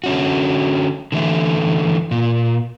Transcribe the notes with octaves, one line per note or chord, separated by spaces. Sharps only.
D3 C#4 F#4
D3 E3 A3
A#2